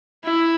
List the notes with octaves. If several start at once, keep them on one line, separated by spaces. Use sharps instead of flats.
E4